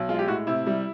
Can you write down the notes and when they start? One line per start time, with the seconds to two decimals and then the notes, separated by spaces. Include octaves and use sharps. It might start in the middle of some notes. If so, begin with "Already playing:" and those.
Already playing: B1
0.09 G#3 F4
0.19 G4
0.28 A2 F#4
0.47 C3 E4
0.67 G3